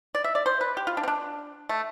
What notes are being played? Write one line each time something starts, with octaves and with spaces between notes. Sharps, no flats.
D5
E5
D5
C5
B4
G4
F4
D4
C4
D4
A3